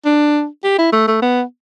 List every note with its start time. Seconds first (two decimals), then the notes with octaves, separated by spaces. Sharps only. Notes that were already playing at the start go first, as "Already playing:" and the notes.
0.05 D4
0.64 G4
0.78 E4
0.93 A3
1.07 A3
1.22 B3